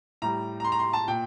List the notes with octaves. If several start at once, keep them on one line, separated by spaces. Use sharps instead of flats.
A2 G3 A#5
A#5
C6
A#5
C6
A5
A#2 G5